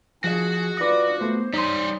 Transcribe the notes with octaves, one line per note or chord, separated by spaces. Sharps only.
F3 F#4 G#4 D#5
F4 B4 D5 D6 D#6 A#6
A3 B3 C5
G3 D#4 C#5 D#5 C6 D#6